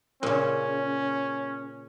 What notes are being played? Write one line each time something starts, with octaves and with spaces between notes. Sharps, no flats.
A#2 C#3 C#4